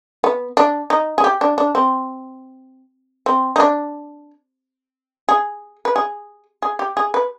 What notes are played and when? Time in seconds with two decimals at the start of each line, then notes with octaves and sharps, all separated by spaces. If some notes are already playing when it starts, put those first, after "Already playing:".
0.24 B3
0.57 D4
0.90 D#4
1.18 G#4
1.24 G4
1.41 D4
1.58 D4
1.75 C4
3.26 C4
3.56 D#4
3.60 D4
5.29 G#4
5.85 B4
5.96 G#4
6.62 G#4
6.79 G4
6.97 G#4
7.14 B4